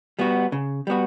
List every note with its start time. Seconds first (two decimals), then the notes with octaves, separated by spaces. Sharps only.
0.19 G3 B3 F#4
0.52 C#3
0.87 G3 B3 F#4